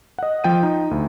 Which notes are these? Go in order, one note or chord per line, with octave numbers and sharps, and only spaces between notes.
D#5 F#5
F3 G5 D#7
D#4
D2